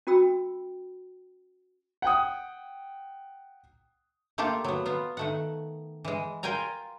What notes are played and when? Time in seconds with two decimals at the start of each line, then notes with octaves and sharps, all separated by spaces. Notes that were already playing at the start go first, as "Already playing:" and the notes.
0.07 C#4 F#4 G5 B5 E6
2.02 F#5 G5 D#6
4.38 A3 A#3 F4 G4 A4
4.64 F#3 B3
4.86 B3 F4
5.17 D#3 A3 F#5
6.05 E3 G#3
6.43 F4 A#4 G5 G#5 A#5